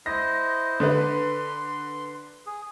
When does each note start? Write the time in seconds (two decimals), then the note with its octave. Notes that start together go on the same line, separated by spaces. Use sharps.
0.06 E4 C5 D#5 A#6
0.80 D3 B4 C6
2.46 G#4